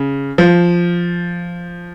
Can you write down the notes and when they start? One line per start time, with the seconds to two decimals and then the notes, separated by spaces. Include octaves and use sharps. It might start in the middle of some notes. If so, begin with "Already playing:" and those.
Already playing: C#3
0.38 F3